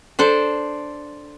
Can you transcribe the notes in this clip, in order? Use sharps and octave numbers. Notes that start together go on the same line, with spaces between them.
D4 A4 C5